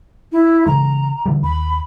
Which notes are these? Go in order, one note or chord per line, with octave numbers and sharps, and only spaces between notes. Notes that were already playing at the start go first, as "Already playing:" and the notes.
E4
C#3 E3 G#3 A#5
D3 E3 G3
D#2 B5